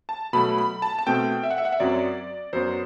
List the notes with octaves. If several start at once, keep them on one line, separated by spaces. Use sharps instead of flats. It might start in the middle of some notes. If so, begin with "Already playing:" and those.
A5
B2 F#3 A3 B5
B5
A5
A5
B2 A3 C4 G5
E5
F#5
E5
F#5
E5
F#2 F#3 C4 D5
F#2 F#3 B3 C5